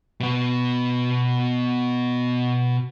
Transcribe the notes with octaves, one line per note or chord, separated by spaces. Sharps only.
B2 B3